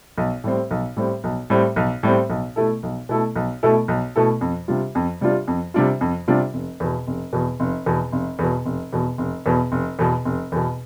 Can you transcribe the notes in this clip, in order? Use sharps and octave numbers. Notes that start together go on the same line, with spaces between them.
B1
A2 G3 C4
B1
A2 G3 C4
B1
A2 G3 C4
B1
A2 G3 C4
B1
B2 A3 E4 A4
B1
B2 A3 E4 A4
B1
B2 A3 E4 A4
B1
B2 A3 E4 A4
F2
C3 G3 D4 F4
F2
C3 G3 D4 F4
F2
C3 G3 D4 F4
F2
C3 G3 D4 F4
F1
E2 B2
F1
E2 B2
F1
E2 B2
F1
E2 B2
F1
E2 B2
F1
E2 B2
F1
E2 B2
F1
E2 B2